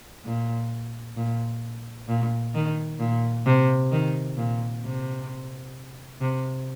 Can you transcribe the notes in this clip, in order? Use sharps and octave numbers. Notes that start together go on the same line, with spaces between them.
A#2
A#2
A#2
D#3
A#2
C3
D#3
A#2
C3
C3